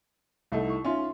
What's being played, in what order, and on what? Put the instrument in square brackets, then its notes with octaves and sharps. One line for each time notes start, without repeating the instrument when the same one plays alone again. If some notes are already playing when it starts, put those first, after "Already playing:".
[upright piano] C2 A3 D#4
[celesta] E4 C#6
[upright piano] C#4 F4 [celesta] D#4 E5 C6